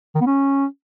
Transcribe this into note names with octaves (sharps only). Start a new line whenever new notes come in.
D#3
B3
C#4